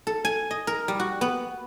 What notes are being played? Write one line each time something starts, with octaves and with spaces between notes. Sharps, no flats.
A4
G#5
D#5
A#4
G3
F#4
B3